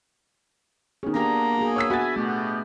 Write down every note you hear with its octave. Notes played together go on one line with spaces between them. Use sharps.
D#3 B3 C#4 G#4
A#3 D4 G4 A#5
F#4 G#4
C#5 E6 B6
B3 F#4 E5 G#5 B5 A6
B2 A3 B3 G4